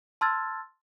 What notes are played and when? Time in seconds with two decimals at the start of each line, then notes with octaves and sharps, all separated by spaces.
0.21 A5 C6 E6 F6 G#6 A6